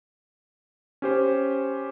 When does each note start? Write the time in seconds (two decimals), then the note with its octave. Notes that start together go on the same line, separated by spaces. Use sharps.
1.02 C#4 G4 C5